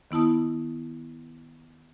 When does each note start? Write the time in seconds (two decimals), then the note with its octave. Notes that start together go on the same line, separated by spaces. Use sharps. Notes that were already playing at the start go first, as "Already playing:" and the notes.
0.11 D#3 B3 E4 A5 D#6